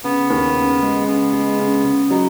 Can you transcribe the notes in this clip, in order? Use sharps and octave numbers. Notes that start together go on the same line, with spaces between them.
C#3 B3
D#2
C#3
G#3
C#3 B3
G#3
C#3
C#3
F#3 D#4